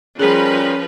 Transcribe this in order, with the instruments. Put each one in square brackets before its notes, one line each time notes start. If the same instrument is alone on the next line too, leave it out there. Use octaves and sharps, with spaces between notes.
[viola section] F3 B4 [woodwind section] G3 A#4 [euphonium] C#4 [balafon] G#4